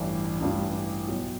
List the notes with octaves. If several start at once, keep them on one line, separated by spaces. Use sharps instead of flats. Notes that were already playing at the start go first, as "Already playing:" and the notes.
Already playing: A1 G2 E3
A1 G2 E3
B1 B2 F#3